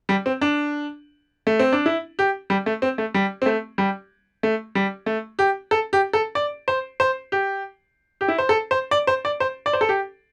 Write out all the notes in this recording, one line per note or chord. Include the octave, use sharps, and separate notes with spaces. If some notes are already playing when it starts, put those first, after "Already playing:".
G3
C4
D4
A3
C4
D4
E4
G4
G3
A3
C4
A3
G3
C4
A3
G3
A3
G3
A3
G4
A4
G4
A4
D5
C5
C5
G4
G4
E4
C5
A4
C5
D5
C5
D5
C5
D5
C5
A4
G4